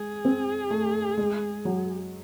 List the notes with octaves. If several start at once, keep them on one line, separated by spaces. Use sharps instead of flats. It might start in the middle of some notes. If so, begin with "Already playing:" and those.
Already playing: G#3 G#4
C4
A3
G#3
F#3